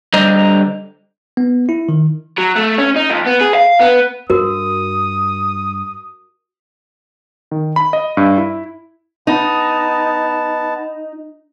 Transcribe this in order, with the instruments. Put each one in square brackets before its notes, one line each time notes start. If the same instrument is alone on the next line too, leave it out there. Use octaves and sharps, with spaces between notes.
[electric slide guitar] D3 G3 C5 D#5 A#5
[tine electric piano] B3
E4
D#3
[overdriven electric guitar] F#3
A3
C#4
D#4
F2
B3
G#4
F5
B3
[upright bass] G2 [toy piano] F#4 A#4 [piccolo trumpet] D#6
[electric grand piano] D#3
B5
D#5
G2
E4
[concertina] B3 A5 [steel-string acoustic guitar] D#4